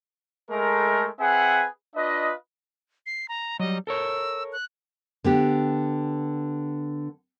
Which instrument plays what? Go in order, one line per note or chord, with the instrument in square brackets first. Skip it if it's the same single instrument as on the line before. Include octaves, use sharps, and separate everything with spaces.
[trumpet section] G#3 A3 A#4
C4 G#4 B4 E5 F#5 G#5
D4 F4 B4 D#5
[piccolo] C7
A#5
[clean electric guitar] F#3 G3 [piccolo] D#5
[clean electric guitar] A4 A#4 C#5 [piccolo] E6
[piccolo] F#6
[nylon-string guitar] D3 B3 G4